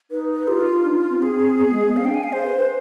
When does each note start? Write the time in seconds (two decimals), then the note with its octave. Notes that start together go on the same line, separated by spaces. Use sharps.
0.11 D#4 B4
0.35 B4
0.47 F4 G4
0.60 D#4
0.73 D#4
0.85 D4
1.10 C4
1.22 C4 G#4
1.59 B3
1.72 G#3
1.84 B3
1.96 C4 F5
2.05 D4 G5
2.14 G#5
2.24 F5
2.33 G#4 C5
2.45 B4
2.58 B4